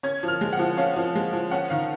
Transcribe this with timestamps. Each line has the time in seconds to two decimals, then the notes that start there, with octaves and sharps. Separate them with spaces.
0.03 C#4 G#6
0.23 F3 F6
0.41 G#3
0.53 F#5
0.59 F3
0.77 C#4 F5
0.96 F3
1.16 G#3
1.33 F3
1.51 C#4 F#5
1.70 D#3 F5